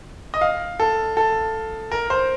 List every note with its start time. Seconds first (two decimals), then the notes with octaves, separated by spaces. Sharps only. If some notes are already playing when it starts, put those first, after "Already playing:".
0.34 D#5
0.41 F5
0.80 A4
1.17 A4
1.92 A#4
2.10 C5